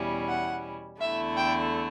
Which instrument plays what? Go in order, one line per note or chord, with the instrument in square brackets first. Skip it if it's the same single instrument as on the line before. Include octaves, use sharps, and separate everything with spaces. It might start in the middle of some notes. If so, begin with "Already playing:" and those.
Already playing: [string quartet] E2 B2 G3 C#4 E4
[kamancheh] F#5
[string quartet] E2 D3 A3 E4 [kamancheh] E5
[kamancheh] G5